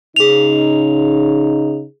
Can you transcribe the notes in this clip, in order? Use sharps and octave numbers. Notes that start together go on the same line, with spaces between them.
C#3 D#4 G#4 F7